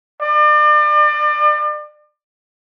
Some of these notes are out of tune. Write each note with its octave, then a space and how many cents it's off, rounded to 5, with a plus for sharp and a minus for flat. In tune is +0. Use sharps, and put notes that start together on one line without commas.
D5 +35